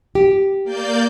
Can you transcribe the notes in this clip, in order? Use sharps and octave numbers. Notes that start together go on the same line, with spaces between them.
G4
A#3 D5 G6